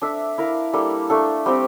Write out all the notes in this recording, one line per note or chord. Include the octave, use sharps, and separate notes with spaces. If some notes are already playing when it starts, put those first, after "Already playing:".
D4 A4 E5
E4 A#4 F5
G3 A#3 D4 A4
A3 D4 A4
G3 C4 G4